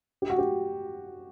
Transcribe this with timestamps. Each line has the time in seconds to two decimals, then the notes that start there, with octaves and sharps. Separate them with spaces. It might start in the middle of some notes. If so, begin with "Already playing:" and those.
0.22 G4
0.30 F#4
0.38 G4